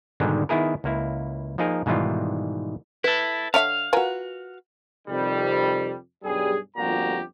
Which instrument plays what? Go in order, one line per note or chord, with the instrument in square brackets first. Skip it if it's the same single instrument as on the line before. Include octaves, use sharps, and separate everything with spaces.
[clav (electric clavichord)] G#2 B2 D3 D#3 G3 G#3
D#3 B3 E4 G#4 A#4
C#2 A#3 E4
F3 A#3 D#4 G#4 A#4
G#2 B2 D#3 E3 G3 F4
[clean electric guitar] E4 A4 [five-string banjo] B4
[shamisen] D3 C#5 E5 [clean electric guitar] F5
[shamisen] F4 A#4 G#5 [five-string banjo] F#4 B4
[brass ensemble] F2 C3 D#3 G3
B1 G2 G3 G#4
G1 F2 A#2 F#4 G4 A#5